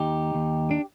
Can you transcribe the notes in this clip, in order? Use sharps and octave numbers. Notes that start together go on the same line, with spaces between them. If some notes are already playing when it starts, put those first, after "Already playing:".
Already playing: D#2 D#4 G4
D#2
D4